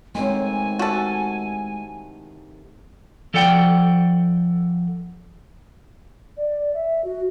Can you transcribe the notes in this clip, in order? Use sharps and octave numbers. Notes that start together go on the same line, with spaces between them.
A2 C3 D#3 G#3 C4 G#5
F#4 A4
F3 A4 D5 F#5 G5
D5
E5
F#4